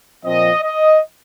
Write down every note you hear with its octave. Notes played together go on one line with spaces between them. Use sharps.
A#2 F3 C4 D#5
D#5